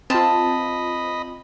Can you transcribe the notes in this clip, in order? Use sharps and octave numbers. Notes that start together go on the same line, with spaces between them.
C4 F4 D#5 A5 B5